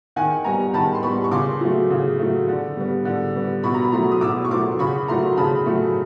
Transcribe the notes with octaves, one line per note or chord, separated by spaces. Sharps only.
D#3 F#5 G#5
G3 B3 G#5 A#5
D#3 A5 B5
C6
G3 B3 B5 C#6
C#6
C#3 C6 D6
F#3 A3
C#3
F#3 A3
D3
G3 B3
D3
G3 B3
B2 B5 C#6
A#5
B5
F#3 A3 A#5 C6
D#6
B2 D6 E6
C#6
F#3 A3 C6 D6
C#3 B5 C#6
F#3 A3 A#5 C6
C#3 A5 B5
F#3 A3